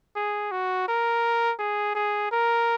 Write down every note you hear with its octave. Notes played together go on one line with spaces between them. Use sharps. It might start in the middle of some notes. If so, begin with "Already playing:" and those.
G#4
F#4
A#4
G#4
G#4
A#4